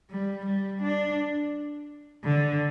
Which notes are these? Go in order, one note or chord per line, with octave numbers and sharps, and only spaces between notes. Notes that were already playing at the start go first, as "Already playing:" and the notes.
G3
G3
D4
D3